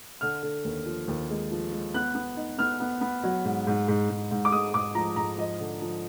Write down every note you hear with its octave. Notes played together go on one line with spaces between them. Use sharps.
D3 F6
D3
D#2
F3
D#2
G#3
F3
G#3
B3 F#6
B3
D#4
B3 F6
B3
B3
F#3
G#2
G#2
G#2
G#2
G#2
D6
G#3 D#6
G#2 D6
F3 A#5
G#2 A#5
F3 D#5
D3
F3